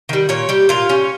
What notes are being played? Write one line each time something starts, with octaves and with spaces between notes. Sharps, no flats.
D#3 G3
A#2 C#5
G3 G4
A#2 F4
G3 C#4